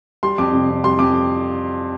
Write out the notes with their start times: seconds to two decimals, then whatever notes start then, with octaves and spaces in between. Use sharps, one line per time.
0.23 G3 C6
0.38 F2 D6
0.53 C3
0.69 F2
0.84 G3 C6
0.99 F2 D6